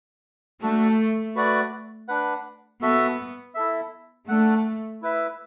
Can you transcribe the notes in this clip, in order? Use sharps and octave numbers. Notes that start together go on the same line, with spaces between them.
A3 D4 F#4 A4
A3 F#4 B4 D5 F#5
D4 B4 F#5
B3 F#4 A4 E5
E4 A4 E5
A3 D4 A4 F#5
E4 B4 E5